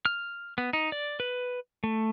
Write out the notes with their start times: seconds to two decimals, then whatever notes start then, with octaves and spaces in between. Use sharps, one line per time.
0.05 F6
0.58 B3
0.73 D#4
0.92 D5
1.20 B4
1.84 A3